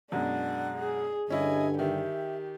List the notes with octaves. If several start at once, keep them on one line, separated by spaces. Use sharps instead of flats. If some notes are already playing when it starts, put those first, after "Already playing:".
F#2 B2 G#3 D4 F#5
G#4
G2 D3 C#4 E4 D#5 G#5
D#3 G4 E5